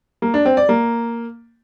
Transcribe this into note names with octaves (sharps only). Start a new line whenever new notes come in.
A#3
D4
C4
D5
A#3